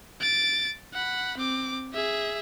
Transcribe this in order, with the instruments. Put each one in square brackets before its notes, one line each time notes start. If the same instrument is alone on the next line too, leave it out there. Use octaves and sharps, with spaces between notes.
[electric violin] A6 D7
F#5 B5
C4 D6
G#4 E5